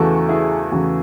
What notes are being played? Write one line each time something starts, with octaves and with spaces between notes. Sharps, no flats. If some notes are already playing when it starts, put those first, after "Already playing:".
Already playing: E2 C#3 E3 A3 F#4 A4
E4 G#4
E2 C#3 E3 A3 F#4